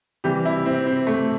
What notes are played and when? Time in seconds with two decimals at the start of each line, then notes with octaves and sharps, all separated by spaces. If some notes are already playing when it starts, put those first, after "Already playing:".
0.24 C3 E3 G3 G4
0.45 E4
0.66 C4
0.86 C4
1.07 A3